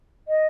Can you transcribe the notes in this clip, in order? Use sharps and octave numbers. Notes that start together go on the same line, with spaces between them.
D#5